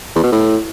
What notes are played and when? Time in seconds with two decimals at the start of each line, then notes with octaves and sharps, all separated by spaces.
0.15 E2
0.24 B2
0.32 A2